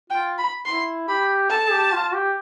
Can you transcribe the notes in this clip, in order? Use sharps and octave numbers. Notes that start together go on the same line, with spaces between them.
F4 G5
B5
E4 C6
G4 B5
A4 A5
G4
F4
G4